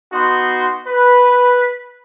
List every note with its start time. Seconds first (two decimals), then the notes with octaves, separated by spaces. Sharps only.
0.12 B3 D#4 F#4 C6
0.87 B4